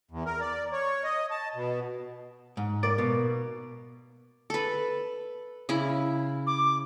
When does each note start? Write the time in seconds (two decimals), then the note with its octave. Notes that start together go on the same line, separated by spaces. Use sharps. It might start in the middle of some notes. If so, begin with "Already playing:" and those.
0.11 E2
0.26 A#4
0.40 D5
0.72 C#5
1.04 D#5
1.31 A5
1.55 B2
2.57 G#2
2.83 A#3 D5
2.98 B2
4.50 A4 B4
5.69 C#3 E4
6.47 D6